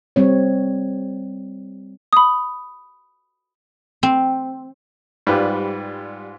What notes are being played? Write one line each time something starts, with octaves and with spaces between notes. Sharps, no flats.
G3 C4 C#5
B5 D#6
C4
G#2 G3 F4 B4